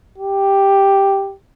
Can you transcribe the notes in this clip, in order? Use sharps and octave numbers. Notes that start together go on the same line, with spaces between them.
G4